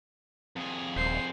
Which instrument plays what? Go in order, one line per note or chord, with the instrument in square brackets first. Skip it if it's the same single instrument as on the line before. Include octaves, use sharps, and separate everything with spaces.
[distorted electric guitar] F2 G#4
[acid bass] D#1 [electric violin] C5 C7